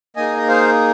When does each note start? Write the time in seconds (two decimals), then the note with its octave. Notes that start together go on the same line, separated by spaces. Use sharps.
0.16 A#3 D#4 G#4 D#5 G#5
0.37 D#5
0.48 C5 F5